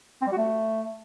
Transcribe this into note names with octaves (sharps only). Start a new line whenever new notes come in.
C4
G3
F#4
A3